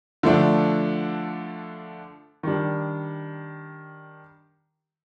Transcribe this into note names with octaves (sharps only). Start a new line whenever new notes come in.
D3 F3 A3 D4
D#3 G3 D4